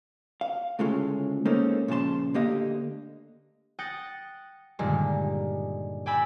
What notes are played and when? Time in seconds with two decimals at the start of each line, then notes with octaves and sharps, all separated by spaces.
0.41 F5
0.79 D2 A2 C#3 G#3 A3 F4
1.46 G#3 A#3 C4 C#4 D#4 A4
1.88 A#2 C#3 F3 A5 C6
2.34 D2 D3 A#3 G4 D#5 F5
3.79 F#5 G5 D#6 A6 A#6 C#7
4.79 G2 A#2 D3 D#3 G3 G#3
6.06 D5 G5 G#5 B5 E6